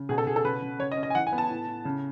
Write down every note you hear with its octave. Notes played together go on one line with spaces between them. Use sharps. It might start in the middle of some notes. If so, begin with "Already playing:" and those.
Already playing: C#3
B2 G#4
A4
B2 G#4
A4
C#3 B4
C#3
C#3 C#5
D#5
C#4
D#5
G#5
E3 F#5
G#5
B3
A5
A2
A2
C#3